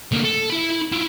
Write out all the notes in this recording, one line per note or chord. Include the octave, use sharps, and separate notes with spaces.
D3 A#3
A4
E4 B5
E4 F4